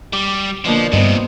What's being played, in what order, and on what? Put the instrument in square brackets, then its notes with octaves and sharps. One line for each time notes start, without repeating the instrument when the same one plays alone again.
[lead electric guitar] G3 [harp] D6
[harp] B2 D3 A#3 [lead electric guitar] F3
[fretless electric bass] G2 [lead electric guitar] C3 F3 [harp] B3 C4 D#4